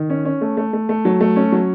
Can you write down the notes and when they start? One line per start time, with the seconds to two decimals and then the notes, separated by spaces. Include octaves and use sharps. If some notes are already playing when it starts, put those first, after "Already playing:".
Already playing: D#3
0.10 C#4
0.25 C#4
0.41 A3
0.57 A3
0.73 A3
0.89 A3
1.05 F#3
1.21 A3
1.36 C#4
1.52 F#3